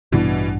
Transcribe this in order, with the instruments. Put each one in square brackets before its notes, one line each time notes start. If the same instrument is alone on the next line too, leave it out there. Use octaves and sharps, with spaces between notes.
[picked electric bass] A1 G2 G3 D4 [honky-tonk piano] B2 E3